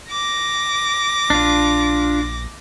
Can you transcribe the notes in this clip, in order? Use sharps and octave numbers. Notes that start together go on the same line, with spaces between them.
D6 A#6
A#1 D4 F4